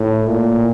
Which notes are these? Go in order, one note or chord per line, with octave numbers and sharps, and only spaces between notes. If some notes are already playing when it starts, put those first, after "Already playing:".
Already playing: A2
A#2